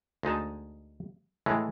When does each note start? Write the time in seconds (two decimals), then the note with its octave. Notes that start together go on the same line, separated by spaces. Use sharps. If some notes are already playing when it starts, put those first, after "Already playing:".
0.23 D2 G#3 D#4 A5
1.46 A2 E3 G#3 A3